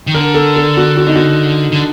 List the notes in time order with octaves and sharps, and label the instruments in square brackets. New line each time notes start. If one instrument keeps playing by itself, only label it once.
[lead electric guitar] D#3
[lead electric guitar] D3 [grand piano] A#4
[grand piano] A4
A4
F#4
F#4
D#4
F#4
[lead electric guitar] D3